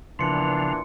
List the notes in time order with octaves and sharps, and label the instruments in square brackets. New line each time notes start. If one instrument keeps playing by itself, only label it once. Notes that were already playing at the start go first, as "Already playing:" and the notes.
[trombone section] A#2 E3 B3 [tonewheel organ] C#3 F3 [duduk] D4 [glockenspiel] C6 C#7